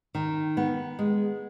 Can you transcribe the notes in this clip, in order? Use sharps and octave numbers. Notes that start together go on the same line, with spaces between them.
D#3
B3
G#3